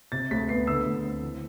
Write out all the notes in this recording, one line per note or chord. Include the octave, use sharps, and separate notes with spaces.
C3 A6
D2 B6
B3 C7
D3 E6
D2
C4
E3